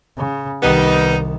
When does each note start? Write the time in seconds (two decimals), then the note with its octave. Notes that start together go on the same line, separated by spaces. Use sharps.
0.18 C#3
0.62 C2 D#3 G3 B3 D#4